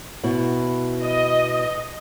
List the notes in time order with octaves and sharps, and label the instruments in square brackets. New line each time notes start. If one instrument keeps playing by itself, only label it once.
[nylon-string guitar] B2 E4
[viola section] D#5